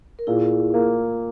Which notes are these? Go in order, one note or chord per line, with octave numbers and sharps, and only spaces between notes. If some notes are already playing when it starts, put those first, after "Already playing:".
A#4
A#2 E4 G#4
A#3